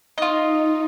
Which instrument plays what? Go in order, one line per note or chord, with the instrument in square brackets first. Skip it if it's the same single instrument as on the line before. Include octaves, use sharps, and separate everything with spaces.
[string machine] D#4 [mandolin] F4 D#5